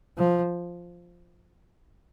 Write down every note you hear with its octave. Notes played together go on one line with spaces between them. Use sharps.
F3